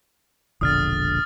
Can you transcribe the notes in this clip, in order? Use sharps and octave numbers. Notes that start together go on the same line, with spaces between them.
E1 A#1 D3 D#6 F6 A6